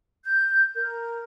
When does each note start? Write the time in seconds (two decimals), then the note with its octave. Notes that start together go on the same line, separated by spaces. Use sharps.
0.24 G6
0.75 A#4